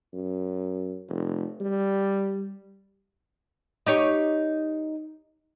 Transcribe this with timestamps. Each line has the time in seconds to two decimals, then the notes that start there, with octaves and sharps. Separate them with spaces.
0.13 F#2
1.09 F1
1.60 G3
3.86 D#4 G4 C#5